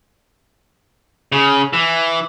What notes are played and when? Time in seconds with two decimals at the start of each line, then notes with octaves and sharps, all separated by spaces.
1.32 C#3
1.73 E3